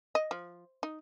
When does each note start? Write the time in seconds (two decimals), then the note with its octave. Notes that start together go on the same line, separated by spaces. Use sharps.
0.15 D#5
0.31 F3
0.83 D#4